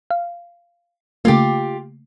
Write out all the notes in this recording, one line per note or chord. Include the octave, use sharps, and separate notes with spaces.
F5
C#3 A3 A#3 F4 G4